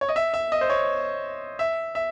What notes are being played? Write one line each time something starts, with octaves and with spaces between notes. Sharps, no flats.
C#5
D#5
E5
E5
D#5
C5
C#5
E5
E5